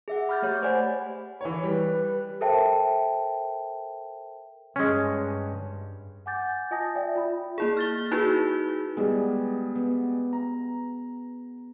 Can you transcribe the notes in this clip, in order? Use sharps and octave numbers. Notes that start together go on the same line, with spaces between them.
G#4 E5 F#5
B5 D6 F6 G6 A6
A3 G4 C#5 G6
C5 D5 F#5 G#5 B5
E3 C#5
G3 B4
A4 A#4 C5 E5 G5 A5
G2 G#3 C#4
F#5 G#5 D6 G6 A6
F4 D#5 G#5 A5 D#6 A#6
D5 E5 G5
F4 B5
A#3 E4 G#4
F6 A6 G7
D#4 E4 F#4 G#4 B4
G3 G#3 B3 G#4
B3
A#5